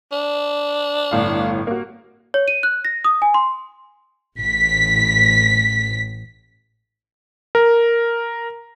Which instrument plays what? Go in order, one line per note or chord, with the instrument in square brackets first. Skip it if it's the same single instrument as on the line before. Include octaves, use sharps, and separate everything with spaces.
[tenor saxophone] D4
[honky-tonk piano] G1 A2 F5
A#3 F#4
[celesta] C#5
D#7
F#6
A#6
D#6
G#5
C6
[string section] A1 B6
[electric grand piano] A#4